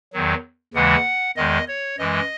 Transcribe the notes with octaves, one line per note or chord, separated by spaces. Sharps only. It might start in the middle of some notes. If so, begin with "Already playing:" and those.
E2 D#3 F#3
D#2 C#3 E3 G#3 F#5
E2 D#3 G#3 D#5
C#5
F#2 E3 G#3 D#5